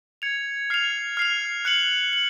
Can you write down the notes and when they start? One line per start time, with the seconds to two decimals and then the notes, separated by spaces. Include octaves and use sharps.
0.22 G#6 C#7 F7
0.70 F6 C7 F7
1.17 F6 C7 F7
1.65 F#6 C#7 F#7
2.13 F#7